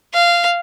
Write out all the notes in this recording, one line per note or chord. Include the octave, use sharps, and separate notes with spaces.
F5